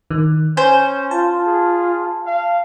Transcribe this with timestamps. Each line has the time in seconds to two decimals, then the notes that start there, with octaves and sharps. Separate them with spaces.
0.10 D#3
0.57 C#4 C5 G#5
1.11 F4 A5
1.46 G#4
2.26 F5